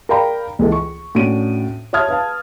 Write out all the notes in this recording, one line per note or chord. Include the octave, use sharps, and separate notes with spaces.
A#4 D5 F5 G5 A#5 B5
C#2 E3 A4
C#6
A2 C#4 D4 F#4 D7 D#7
C#5 E5 A5 D#6 F6 G#6
B4 F5 A5